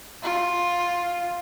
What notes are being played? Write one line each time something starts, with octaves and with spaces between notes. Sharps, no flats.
F4